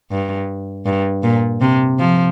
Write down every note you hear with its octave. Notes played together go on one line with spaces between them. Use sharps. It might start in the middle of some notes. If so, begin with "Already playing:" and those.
G2
G2
A#2
C3
F3